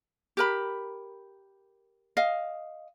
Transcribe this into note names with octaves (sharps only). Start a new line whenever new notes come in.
G4 A#4 B5
D#5 F5